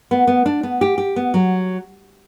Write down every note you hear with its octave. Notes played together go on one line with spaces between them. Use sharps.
B3
B3
D4
B3
G4
G4
B3
F#3